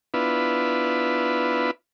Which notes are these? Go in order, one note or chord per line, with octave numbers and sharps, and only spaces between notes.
B3 D4 E4 F4 B4